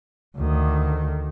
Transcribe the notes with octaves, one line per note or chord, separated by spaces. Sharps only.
D2 D#3